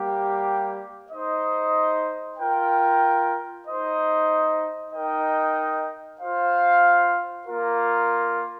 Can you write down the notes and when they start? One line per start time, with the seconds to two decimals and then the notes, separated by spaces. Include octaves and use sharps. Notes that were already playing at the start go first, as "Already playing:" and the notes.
Already playing: G3 A#3 G4
1.11 D#4 C5 D#5
2.38 F4 A#4 G5
3.65 D#4 C5 D#5
4.92 D#4 A#4 D#5 G5
6.20 F4 C5 F5
7.48 A#3 F4 A#4